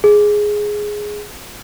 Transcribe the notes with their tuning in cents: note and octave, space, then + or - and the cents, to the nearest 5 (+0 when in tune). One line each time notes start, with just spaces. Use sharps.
G#4 +5